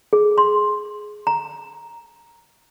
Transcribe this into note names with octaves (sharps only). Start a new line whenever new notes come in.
G#4
C6
A#5